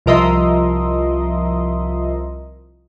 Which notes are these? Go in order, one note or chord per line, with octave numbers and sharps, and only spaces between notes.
C2 F3 A#4 D#5 E5 C6